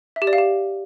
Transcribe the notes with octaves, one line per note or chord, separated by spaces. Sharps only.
E5
G4
D5
F5
G4